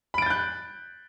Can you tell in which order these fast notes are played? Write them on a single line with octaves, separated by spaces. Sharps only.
B5 D7 A6 G6 F#6